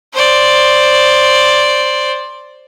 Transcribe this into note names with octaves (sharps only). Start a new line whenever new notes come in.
C5 D5